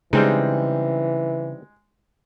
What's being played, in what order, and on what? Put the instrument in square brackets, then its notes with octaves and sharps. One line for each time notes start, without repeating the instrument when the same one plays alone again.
[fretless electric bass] C#3 [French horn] E3 [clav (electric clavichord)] G3 C4 D#4 [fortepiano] G#3